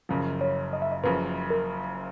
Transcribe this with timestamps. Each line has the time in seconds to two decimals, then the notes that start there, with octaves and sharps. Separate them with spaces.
0.09 F#1 F#2 C#3 F3
0.41 C#5
0.73 D#5
0.82 E5
0.92 D#5
1.04 F#1 F#2 C#3 F3 B4
1.50 A#4